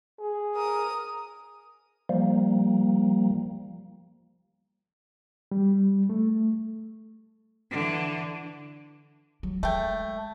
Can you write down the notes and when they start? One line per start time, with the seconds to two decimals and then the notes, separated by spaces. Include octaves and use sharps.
0.20 G#4
0.56 A#4 D#6
2.09 F3 G3 A#3
5.51 G3
6.09 A3
7.71 D3 E3
9.43 F#3
9.63 G#3 A3 G5